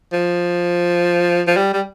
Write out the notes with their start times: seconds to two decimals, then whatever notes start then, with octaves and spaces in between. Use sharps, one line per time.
0.13 F3
1.47 F3
1.57 G3
1.73 G3